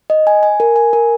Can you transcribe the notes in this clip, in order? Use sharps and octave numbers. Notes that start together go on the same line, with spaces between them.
D#5
G#5
G#5
A#4
G#5
A#4